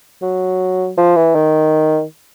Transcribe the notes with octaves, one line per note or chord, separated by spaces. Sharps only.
F#3
F3
E3
D#3